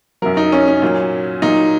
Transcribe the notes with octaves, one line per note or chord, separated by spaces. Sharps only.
F#2 F#3 A#4
D#4
C#4
C#4
A#2 F#3
A#2 F#3 D#4